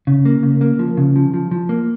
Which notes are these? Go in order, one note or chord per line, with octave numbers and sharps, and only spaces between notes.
C#3
A#3
C#3
A#3
F3
C#3
F3
F3
F3
A#3